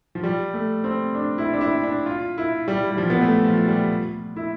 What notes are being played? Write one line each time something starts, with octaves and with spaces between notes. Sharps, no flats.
F3
G3
A3
C4
D4
E4
D4
E4
D4
F4
E4
G3
G3
F3
B3
A3
F3
G3
E4